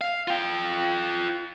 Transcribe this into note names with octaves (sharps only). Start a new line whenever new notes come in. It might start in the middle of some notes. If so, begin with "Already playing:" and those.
F5
F4 G5